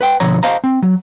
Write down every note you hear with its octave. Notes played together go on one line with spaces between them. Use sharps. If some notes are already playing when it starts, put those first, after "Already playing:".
B4 F#5 G5
B2 D3 F3 C#5 A#5
C5 D#5 F5 A5 A#5
C4
F#3